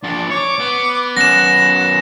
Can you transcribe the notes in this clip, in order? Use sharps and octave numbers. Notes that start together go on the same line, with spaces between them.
F3 D4 D5
C#5 D6
B3
F#2 B3 F#5 A#6 E7